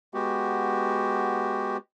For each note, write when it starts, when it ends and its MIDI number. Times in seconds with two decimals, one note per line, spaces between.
0.14 1.77 56
0.14 1.77 59
0.14 1.77 66
0.14 1.77 67